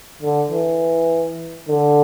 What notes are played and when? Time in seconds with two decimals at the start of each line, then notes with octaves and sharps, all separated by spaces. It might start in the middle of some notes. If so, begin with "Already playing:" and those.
0.22 D3
0.51 E3
1.68 D3